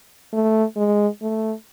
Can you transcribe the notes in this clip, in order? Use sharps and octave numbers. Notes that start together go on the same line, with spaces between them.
A3
G#3
A3